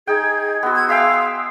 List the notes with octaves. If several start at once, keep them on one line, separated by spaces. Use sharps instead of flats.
D#4 G#4 G5 G#6
B3 F#4 C6 E6
G#6
G#4 E5 F5 G5